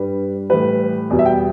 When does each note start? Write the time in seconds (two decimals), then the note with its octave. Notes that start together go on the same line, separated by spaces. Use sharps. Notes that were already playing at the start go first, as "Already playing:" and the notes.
Already playing: G2 G3 B4
0.49 A2 E3 G3 B4
1.10 E2 B2 G3
1.19 E5
1.25 G5